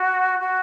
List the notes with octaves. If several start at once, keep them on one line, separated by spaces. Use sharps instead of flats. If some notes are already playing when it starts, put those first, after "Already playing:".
Already playing: F#4
F#4